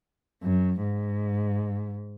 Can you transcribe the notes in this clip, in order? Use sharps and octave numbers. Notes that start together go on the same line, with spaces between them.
F#2
G#2